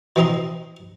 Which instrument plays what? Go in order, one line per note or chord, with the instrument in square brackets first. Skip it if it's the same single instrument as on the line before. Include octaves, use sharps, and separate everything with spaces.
[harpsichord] B2 E3 C4 D#5 A#5 C6